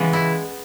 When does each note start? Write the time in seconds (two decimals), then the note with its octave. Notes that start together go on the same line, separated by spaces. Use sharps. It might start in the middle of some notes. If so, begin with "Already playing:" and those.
Already playing: C#3 E3 G#3 B3
0.13 E4